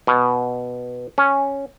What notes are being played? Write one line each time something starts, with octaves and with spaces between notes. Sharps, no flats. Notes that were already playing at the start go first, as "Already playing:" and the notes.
B2
C#4